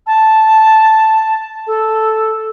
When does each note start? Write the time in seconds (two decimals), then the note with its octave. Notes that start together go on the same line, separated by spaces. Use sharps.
0.07 A5
1.67 A4